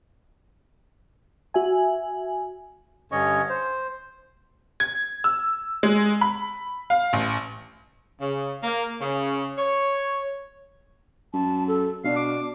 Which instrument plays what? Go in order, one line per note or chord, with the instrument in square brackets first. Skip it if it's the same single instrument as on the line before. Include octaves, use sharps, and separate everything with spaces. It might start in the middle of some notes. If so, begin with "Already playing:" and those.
[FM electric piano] F#4 E5 G#5
[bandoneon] G2 D3 C#4 C#5 D#5 C#6
C5
[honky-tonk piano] G#6
E6
G#3
B5
F5
A1
[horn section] C#3
A#3
C#3
C#5
[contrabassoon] F#2 [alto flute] A5
[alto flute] A4
[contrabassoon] B2 [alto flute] D4 [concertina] F5
[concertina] D6